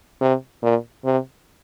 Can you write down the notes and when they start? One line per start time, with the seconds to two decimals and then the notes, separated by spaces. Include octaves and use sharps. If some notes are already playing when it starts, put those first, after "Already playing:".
0.21 C3
0.63 A#2
1.05 C3